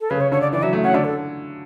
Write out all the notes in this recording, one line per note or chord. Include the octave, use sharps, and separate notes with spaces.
A4
C#3 B4
C#5
D3 C#5
D5
E3 D5
F#3 E5
A3
C#4 F#5
D3 D5
A4